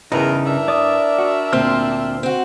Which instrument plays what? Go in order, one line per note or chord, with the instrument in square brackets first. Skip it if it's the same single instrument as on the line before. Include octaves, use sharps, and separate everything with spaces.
[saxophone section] E2 A#4 [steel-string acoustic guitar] G2 [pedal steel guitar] C#3 D#4 [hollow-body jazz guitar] E4 B4
[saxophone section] D4 A#4 E5
[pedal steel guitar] D5 D#6
[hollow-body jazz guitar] F#4
[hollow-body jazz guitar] D2 A#2 A5 [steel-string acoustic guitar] C4 [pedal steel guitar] C6 F6
[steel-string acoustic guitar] C4 F#4